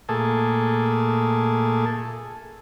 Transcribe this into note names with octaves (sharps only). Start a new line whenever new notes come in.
A#2 A3 G#4 A4